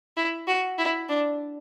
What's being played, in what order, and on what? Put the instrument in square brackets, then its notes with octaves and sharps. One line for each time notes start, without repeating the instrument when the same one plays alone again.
[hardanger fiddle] E4
F#4
E4
D4